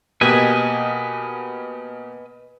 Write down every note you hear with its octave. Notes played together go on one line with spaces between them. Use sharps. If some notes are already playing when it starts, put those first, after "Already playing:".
B2 A#3 G4 B4 D#5 G#5